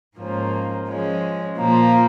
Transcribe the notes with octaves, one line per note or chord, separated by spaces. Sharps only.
G#2 F3 A#3 C#4
F3 G#3 C#4
A#2 F3 A#3